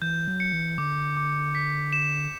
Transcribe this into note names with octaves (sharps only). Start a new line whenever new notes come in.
E3 G6
F#3
C#7
E3
D3 D6
D6
B6
E7